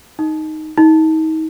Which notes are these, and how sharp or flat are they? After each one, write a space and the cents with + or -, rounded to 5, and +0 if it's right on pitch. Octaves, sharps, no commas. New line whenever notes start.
D#4 +0
D#4 +35